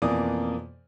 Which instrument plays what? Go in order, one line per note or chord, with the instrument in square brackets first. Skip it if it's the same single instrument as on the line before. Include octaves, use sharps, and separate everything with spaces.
[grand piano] F2 B2 E3 A#3 D5 D#6